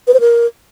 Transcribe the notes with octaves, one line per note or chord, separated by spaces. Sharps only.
B4
C5
A#4